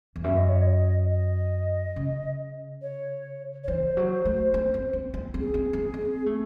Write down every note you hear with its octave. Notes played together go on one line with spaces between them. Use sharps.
E2
F#2 E5
D#5
C#5
D#5
D#5
C#3
C#5
C#5
E3 C5
F#3
A3
C4
C4
C4
C4
C4
G#4
C4
C4
C4
A3